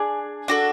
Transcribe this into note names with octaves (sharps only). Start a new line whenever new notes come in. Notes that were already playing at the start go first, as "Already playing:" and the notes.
Already playing: D4 G#4
D4 F#4 A4